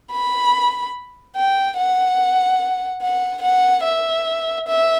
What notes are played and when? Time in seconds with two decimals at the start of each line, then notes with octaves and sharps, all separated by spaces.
0.12 B5
1.36 G5
1.77 F#5
3.02 F#5
3.42 F#5
3.84 E5
4.67 E5